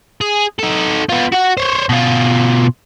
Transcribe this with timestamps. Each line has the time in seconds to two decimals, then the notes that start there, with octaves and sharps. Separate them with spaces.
0.21 G#4
0.59 D#4 A4
1.09 B3 F4
1.32 F#4 F#5
1.57 C5 C#5
1.89 B2 F4